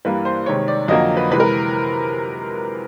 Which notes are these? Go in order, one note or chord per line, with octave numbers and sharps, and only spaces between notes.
G2 E3 G3 A#3 B4
C5
C3 D#3 G#3 C#5
D5
F2 D3 F#3 A#3 D#5
B4
C3 E3 G#3 B4
A#4